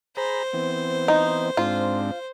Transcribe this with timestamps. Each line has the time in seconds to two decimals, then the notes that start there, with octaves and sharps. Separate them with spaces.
0.17 G#4 C5 A#5 B5
0.53 E3 B3 C4
1.08 D#4
1.57 G#2 C4 D4 F4